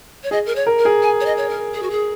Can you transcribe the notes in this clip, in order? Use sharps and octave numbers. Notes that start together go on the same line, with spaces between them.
C#5
G#4 D#5
A#4
C#5
A#4
A#4
G#4
G#5
C#5
D#5
C#5
A#4
G#4
F#4
G#4